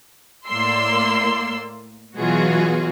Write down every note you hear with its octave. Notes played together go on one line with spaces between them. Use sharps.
A2 A#3 D5 C6 E6
B2 E3 F#3 F4 F#4 G#4